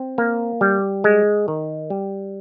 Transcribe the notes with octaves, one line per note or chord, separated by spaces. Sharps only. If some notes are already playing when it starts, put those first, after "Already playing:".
Already playing: C4
A#3
G3
G#3
D#3
G3